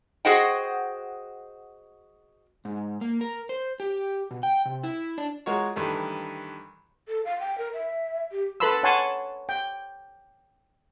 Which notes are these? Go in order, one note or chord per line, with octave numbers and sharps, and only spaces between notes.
F#4 G#4 C5 D#5 F#5 G5
G#2
A#3
A#4
C5
G4
B2
G5
C3
E4
D4
G#3 F4 F#4 A#4 C#5
G2 D#3 E3 A3
A4
F5
G5
A#4
E5
G4
A4 B4 A5 B5 C6 E6
C#5 F#5 G#5 A5 C6
G5